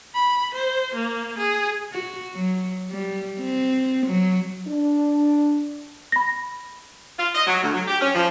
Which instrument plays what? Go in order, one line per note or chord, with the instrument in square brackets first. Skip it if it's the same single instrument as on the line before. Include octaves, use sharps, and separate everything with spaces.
[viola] B5
C5
A#3
G#4
[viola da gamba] F#4
F#3
G3
C4
F#3
[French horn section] D4
[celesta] B5 A#6
[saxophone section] F4
D#5
F#3
D2
F#3
G4
C#4
F3